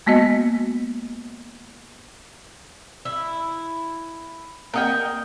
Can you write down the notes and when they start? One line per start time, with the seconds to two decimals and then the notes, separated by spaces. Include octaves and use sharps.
0.06 G#3 A#3 B3 F#4 D#5
3.05 E4
4.74 A#3 C4 A#4 D#5 F#5 G5